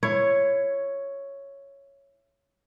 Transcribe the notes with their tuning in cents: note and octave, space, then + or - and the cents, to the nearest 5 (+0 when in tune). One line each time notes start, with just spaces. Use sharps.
E4 +25 C#5 +0